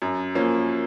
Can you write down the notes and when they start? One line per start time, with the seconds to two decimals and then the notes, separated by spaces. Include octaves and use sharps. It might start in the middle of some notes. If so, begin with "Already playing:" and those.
0.02 F#2
0.35 F3 A#3 C#4